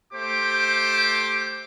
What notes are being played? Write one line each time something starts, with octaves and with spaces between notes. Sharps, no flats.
A3 G4 C5 D6